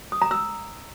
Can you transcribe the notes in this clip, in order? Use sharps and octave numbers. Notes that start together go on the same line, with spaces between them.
D#6
A#5
E6